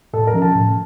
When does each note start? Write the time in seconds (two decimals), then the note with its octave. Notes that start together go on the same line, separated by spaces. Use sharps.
0.13 A2 A4
0.27 A#4
0.34 F3 C#4
0.42 A5
0.55 A2